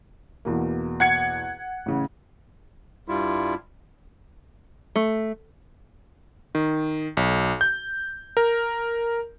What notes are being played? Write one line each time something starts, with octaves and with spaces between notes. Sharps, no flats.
E2 B2 A#3
F#5 G#6 C#7
A1 C#3
G2 G3 E4 F4
A3
D#3
B1
G6
A#4